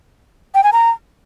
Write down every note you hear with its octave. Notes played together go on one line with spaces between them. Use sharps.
G5
G#5
A#5